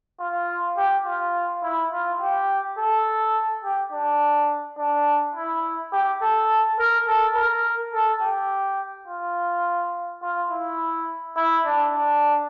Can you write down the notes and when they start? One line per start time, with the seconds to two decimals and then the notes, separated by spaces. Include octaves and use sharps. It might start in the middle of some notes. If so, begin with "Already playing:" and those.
0.20 F4
0.77 G4
1.06 F4
1.63 E4
1.92 F4
2.20 G4
2.78 A4
3.64 G4
3.92 D4
4.78 D4
5.36 E4
5.92 G4
6.22 A4
6.79 A#4
7.07 A4
7.36 A#4
7.93 A4
8.21 G4
9.07 F4
10.22 F4
10.51 E4
11.36 E4
11.65 D4
11.94 D4